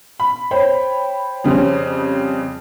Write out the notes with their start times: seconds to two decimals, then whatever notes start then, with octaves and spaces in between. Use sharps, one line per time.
0.20 B5
0.51 C5 C#5 G5 B5
1.44 F2 C#3 G3 C4 C#4